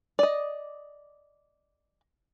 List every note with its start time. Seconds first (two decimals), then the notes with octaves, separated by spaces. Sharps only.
0.19 D5 D#5